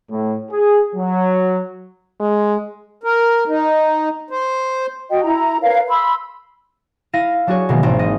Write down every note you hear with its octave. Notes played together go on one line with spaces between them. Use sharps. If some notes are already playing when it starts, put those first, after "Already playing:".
A2
G#4
F#3
G#3
A#4
D#4
C5
F#4 D#5 G5
E4 A#5
A#4 B4 C#5 F5
B5 C6 E6
E4 F5 A#6 D#7
F#3 D4 F#4 G#4 C#5
B2 D#3 E3 G#3 A#3
G#1 C4 G5
D#5